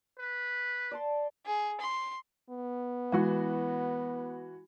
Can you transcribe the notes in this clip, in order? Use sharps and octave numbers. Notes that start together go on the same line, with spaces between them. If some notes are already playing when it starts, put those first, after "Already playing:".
B4
D5 A5 C6
G#4
C6
B3
E3 G#3 E4 F#4